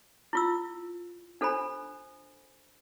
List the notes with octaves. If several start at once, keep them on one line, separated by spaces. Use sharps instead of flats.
E4 F4 E6
D4 A4 C5 G#5 B5